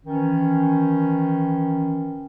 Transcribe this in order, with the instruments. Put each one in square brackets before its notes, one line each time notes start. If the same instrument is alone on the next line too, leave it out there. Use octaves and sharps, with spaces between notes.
[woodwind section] D#3 E3 C#4